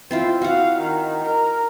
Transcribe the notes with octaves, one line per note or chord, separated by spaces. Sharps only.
C4 E4 F4 C5
F#4 F5 F#5
D#3
A#4